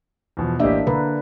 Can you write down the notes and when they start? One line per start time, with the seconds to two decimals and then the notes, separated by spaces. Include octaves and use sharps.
0.37 E2 B2 F3
0.59 A1 A#3 D4 G4 D#5 E5
0.87 D3 A#4 B4